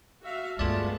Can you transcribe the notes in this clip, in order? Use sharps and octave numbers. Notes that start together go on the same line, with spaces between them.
F#4 E5 F5
D2 G2 G#3 A3 B3 F4 D5 A5